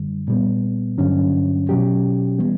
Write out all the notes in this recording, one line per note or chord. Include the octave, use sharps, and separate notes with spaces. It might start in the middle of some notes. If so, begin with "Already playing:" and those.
Already playing: F#2 D3 G3
A#2 G3 B3
G2 D3 F#3 C#4
B2 F#3 C#4 G4
E3 G3 B3